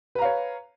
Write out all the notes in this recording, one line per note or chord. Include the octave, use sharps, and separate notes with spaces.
B4 C#5 F5 A#5